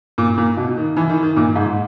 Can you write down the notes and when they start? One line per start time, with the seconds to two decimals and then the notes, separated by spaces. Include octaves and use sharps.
0.18 A#2
0.38 A#2
0.57 B2
0.77 D#3
0.97 E3
1.09 D#3
1.23 D#3
1.36 A#2
1.56 G#2